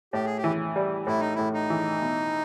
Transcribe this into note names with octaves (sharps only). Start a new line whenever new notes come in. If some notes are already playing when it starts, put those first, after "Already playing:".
A2 G4
G#4
G4
E3
G3
A2 E4
D#4
A2 E4
D#4
E3
B2